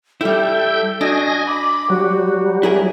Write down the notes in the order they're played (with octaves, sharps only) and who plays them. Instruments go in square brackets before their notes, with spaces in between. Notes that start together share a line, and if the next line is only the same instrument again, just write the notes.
[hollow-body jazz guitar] G3 E4 [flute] A4 [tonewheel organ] E5 G5 G6
[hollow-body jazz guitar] D4 [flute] F#4 [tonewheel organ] D#5 G#5 A#6
[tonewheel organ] B5 [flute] D6
[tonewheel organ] F#3 G3 [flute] F#4
[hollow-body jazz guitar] E4 G#4 A#4